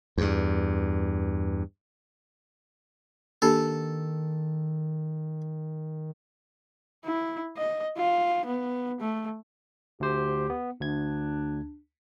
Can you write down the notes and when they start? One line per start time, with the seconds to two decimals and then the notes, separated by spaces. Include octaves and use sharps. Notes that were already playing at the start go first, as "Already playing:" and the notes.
0.18 E2 G2
3.42 D#3 A#3 D4 G4 A4
7.05 E4
7.57 D#5
7.97 F4
8.45 B3
9.00 A3
10.00 D2 G4 C5
10.50 B3
10.80 D2 D4 G#6